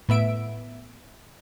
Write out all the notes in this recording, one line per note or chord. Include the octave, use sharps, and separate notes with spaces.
A2 B3 E5 D7